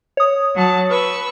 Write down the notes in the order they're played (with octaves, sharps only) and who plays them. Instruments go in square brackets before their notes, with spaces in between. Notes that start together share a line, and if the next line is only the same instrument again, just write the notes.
[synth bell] C#5 D#6
[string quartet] F#3 A5
B4 C#6 E6